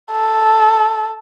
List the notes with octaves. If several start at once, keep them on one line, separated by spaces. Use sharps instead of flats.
A4